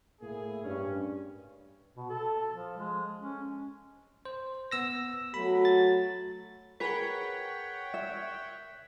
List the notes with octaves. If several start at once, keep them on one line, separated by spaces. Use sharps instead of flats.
A2 A#3 E4 G#4
G2 C#4
B2
A4
F3
G#3
C#4
C5
B3 E6 A#6
F#3 A3 F#4 B5
A6
G#4 A#4 B4 C#5 F#5 G5 B6
E5